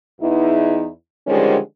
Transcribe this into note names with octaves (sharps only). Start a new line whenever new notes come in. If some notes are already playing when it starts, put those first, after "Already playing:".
E2 D#4 E4
D3 D#3 F3 G3 G#3 C#4